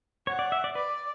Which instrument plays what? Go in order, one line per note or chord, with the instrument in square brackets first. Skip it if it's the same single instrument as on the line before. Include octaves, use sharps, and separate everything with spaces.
[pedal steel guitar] C#5 [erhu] F#5
[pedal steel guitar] D5
E5
D5
[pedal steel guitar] B4 [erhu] D5